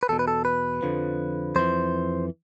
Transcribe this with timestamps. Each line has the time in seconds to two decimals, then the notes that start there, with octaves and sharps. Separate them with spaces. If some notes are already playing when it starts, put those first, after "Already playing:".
0.03 B4
0.09 E2 B2 A4
0.19 B4
0.28 A4
0.45 B4
0.83 F2 D3 F3
1.56 F2 E3 C5